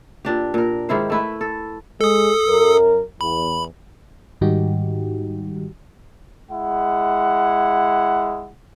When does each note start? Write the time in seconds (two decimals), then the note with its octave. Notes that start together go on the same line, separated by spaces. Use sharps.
0.25 A#2 D4 G4
0.54 A#2 A#4
0.89 G#2 D#3 E4 C5
1.10 A3 E4 B4
1.41 A4
2.01 G#3 G#4 A4 D#6
2.48 F#2 A#4
3.21 E2 B5
4.41 G#2 D#3 G3 D#4 F#4 G4
6.51 G#3 E4 F#5